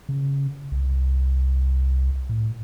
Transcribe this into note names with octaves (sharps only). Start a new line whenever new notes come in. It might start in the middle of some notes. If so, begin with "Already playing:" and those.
C#3
C2
A2